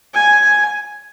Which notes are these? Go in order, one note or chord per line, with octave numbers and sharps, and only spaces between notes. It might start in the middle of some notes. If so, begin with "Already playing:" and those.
G#5